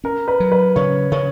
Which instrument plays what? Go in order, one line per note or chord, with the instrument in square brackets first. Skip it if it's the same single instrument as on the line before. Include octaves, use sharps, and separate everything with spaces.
[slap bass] C#4 [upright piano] A#4
[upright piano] B4
[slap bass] F#3
[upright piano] B4
[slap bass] C#3 [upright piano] C#5
[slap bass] C#3 [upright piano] C#5